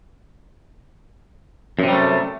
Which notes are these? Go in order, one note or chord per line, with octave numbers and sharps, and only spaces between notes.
F#2 C3 G3 A3